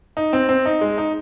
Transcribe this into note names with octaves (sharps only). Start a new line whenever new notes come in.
D#4
C4
C4
D#4
G#3
D#4